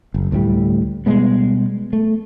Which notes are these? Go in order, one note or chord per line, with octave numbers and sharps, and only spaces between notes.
F#1
D2 A2 G3
B2 G3 G#3 B3
A3